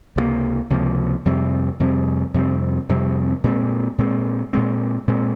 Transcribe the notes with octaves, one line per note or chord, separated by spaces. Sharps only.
C#2 C3 F3 A#3
C#2 C3 F3 A#3
F2 C3 G3 C4
F2 C3 G3 C4
F2 C3 G3 C4
F2 C3 G3 C4
A#2 G#3 C4
A#2 G#3 C4
A#2 G#3 C4
A#2 G#3 C4